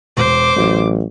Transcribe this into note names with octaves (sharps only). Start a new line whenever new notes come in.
E1 C5 D6
A1 F#3